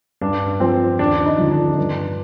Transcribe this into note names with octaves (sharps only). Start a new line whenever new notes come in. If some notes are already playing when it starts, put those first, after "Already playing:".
G2 D4
F3 C4
D#2 D4
D#4
D3 F3
D4
G2